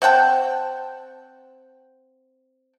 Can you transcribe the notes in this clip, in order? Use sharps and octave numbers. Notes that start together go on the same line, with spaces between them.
C4 F#5 G5 A5